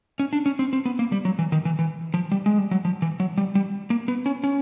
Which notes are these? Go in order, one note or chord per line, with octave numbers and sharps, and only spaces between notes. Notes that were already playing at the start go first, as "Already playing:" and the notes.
C#4
D4
C#4
C4
C4
B3
A#3
G3
F#3
E3
D#3
E3
E3
F3
G3
G#3
G3
F#3
F3
E3
F#3
G3
G3
A#3
B3
C#4
C#4